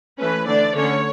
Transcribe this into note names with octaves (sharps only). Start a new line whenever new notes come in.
E3 A3 C#4 B4
D3 A3 D4 D5
D3 A3 C#4 C#5